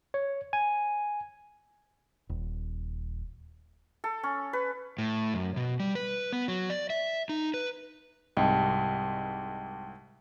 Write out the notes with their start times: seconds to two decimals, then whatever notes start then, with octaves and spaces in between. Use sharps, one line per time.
0.14 C#5
0.53 G#5
2.29 D#1
4.04 A4
4.23 C#4
4.53 B4
4.98 A2
5.34 F#2
5.56 B2
5.80 G3
5.95 B4
6.33 B3
6.48 F#3
6.70 D5
6.90 E5
7.29 D#4
7.54 B4
8.37 C2 G#2 D#5 G5 A5